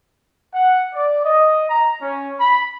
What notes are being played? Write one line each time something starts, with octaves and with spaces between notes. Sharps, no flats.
F#5
D5
D#5
A#5
C#4
B5